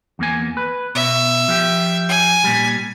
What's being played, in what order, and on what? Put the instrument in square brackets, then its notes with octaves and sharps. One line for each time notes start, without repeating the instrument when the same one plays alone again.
[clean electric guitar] E2 A#3 G#5
B4
[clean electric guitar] B2 [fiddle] E5
[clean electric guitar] F3 G4
[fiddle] G#5
[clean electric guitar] A#2 G3